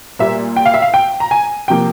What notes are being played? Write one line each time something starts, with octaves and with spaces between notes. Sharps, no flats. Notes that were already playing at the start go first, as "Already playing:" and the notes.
A#2 G3 A#3 E5
G5
F5
E5
F5
G5
A#5
G#5
C3 F3 A#3 G5